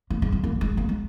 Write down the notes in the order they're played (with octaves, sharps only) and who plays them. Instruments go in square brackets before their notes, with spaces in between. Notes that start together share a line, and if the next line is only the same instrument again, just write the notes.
[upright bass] A#3
G#3
G#3
A#3
G#3
A#3
G#3